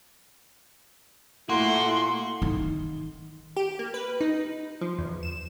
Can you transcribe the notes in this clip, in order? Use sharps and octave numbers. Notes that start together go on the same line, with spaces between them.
A#2 A3 A#3 E4 F#4 C6
D#3
G4
A#3
B4
D#4
F3
E2
E7